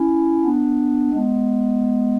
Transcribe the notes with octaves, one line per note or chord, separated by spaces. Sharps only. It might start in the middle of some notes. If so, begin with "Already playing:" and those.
Already playing: C#4 E4
B3 D4
G#3 B3